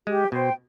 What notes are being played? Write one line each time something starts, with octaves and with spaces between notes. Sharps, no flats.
G#3 G4
B2 C5 G5